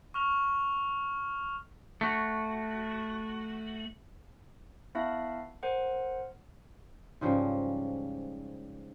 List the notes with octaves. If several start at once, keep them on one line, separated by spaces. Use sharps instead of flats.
C#6 F6 F7
A3 F#4
B3 E4 E5 F5 A5
A#4 C5 F#5
G#2 C#3 F3 G3